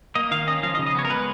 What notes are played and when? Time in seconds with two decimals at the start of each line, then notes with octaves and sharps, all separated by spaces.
0.15 A#3 D#5
0.31 D#3 F5
0.47 C#4 D#5
0.63 F3 F5
0.75 D#5
0.79 C#3
0.86 D#5
0.95 B3 C#5
1.05 A#4
1.10 G#3 B4